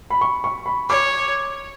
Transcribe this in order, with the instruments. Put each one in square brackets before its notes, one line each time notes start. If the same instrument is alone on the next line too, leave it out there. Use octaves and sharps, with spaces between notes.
[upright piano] B5
C#6
C#6
B5
[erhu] C#5 [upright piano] D6